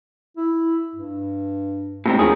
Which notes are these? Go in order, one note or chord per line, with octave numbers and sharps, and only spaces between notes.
E4
G2
A2 C3 G#3 C4
D#2 D#3 F3 G#4